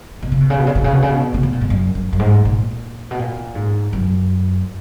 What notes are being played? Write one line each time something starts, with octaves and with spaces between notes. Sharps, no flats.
B2
C#3
B2
C#3
B2
C#3
B2
C#3
B2
C#3
B2
C#3
B2
A#2
G#2
F#2
F#2
F#2
G#2
A#2
B2
A#2
G#2
F#2